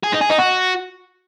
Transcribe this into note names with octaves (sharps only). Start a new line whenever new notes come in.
G#4
D#4
G#4
D#4
F#4